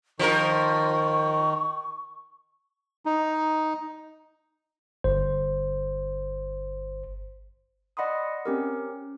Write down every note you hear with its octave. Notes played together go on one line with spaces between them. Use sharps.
D#3 F3 A#4 C#6
D#4
G1 C5
D5 D#5 F#5 B5 C6 D#6
C4 C#4 G4 A#4